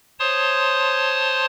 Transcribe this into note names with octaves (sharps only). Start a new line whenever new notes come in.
C5 C#5 A5 C6 D#6